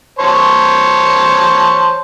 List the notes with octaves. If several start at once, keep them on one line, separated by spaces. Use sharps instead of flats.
C5 C#5 A5